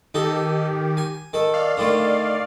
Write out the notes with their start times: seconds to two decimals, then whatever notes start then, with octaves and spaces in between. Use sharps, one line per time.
0.14 D#3 D#4 G4 A4
0.97 G#5
1.33 D#3 A4
1.54 D5 F5
1.77 D3 D#3 A3